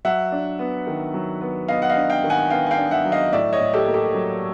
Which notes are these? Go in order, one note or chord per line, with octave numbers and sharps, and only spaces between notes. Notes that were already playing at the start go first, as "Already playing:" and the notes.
F#3 E5 F#5
D4
B3
D#3
F#3
B3
B3 D#5 F5
F#5
D#5 F5
D4
F5 G5
D#3
F#5 G#5
B3 F5 G5
G#5
F5 G5
D4
E5 F#5
F#3
D#5 F5
A2 D5 E5
C#5 D#5
A2
G4 A4
A#3
G4 A4
F#3